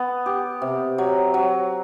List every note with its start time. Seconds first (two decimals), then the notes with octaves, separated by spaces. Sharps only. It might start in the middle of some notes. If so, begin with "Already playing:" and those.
Already playing: B3
0.26 G4
0.62 C3
0.98 F#3
1.34 F#3